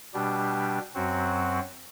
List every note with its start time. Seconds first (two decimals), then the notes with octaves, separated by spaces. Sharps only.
0.14 B2 G3 D4 G4
0.95 F#2 F#3 C4 F#4